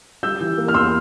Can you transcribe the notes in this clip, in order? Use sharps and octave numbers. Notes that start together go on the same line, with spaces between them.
G3 E6 G6
E3
A#3
F6
E2 C6 E6